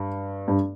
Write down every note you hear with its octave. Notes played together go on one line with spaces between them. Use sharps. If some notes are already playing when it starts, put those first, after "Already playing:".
Already playing: G2
G2